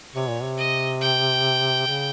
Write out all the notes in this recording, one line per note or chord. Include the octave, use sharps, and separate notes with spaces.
C3 C#5
A#2
C3
D#5
G5
C#3